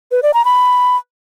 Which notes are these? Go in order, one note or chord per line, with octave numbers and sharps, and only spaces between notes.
B4
D5
A#5
B5